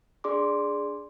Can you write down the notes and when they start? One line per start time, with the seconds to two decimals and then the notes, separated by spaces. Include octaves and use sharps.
0.24 D4 G#4 D5 C6 D6